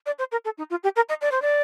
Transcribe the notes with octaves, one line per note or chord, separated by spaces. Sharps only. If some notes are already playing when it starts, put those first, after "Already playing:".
D5
C5
A#4
A4
D#4
F4
G4
A#4
D#5
D5
C5
D5